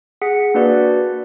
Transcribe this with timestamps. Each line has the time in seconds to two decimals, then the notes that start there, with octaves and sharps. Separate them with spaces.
0.22 G#4 F#5 B6 C#7
0.54 A#3 D4 F#4 B4 D5